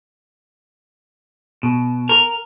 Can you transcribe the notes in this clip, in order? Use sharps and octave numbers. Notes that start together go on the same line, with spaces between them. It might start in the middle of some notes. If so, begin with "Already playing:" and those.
B2
A#4